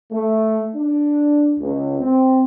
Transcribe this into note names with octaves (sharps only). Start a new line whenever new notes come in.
A3
D4
C#2
C4